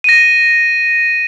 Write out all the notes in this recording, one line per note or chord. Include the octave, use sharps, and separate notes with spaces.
A#6 D#7